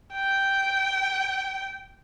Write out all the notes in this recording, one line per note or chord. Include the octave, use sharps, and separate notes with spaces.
G5